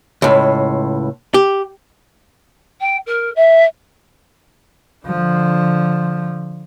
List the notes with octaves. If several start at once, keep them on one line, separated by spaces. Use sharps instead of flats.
C#2 A2
G4
G5
A#4
E5
D3 F3